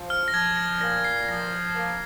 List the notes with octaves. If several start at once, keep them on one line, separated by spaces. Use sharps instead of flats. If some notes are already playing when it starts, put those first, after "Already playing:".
Already playing: F3
F6
A#6
F3 G#6
A#6
A#2 A#6
C7
F3 A#6
A#3